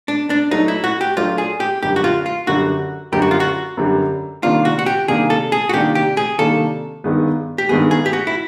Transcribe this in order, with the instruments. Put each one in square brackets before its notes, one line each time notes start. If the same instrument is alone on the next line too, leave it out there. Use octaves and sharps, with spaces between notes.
[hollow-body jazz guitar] D4
D4
[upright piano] F#3 A3 D4 [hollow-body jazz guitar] D#4
[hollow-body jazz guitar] E4
F#4
G4
[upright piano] F#3 A3 D4 [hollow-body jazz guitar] F4
[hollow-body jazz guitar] G#4
G4
[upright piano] F#2 D3 G3 [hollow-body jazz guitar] G4
[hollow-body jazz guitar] F#4
F4
F4
[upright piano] F#2 D3 G3 [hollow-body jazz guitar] F#4
[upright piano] F#2 D3 G3 [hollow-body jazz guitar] G4
[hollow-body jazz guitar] F#4
F4
F#4
[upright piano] F#2 D3 G3
[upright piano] C3 D#3 G3 A#3 D4 [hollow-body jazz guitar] F4
[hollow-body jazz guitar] F#4
F#4
G4
[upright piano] C3 D#3 G3 A#3 D4 [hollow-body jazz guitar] G#4
[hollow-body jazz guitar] A4
G#4
F#4
[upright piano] C3 D#3 G3 A#3 D4 [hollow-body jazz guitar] G4
[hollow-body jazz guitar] G4
G#4
[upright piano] C3 D#3 G3 A#3 D4 [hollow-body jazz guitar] A4
[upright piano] G2 D#3 G#3 B3
[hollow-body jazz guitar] G4
[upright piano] G2 D#3 G#3 B3 [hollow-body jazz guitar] G#4
[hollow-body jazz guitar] G#4
G4
F#4
E4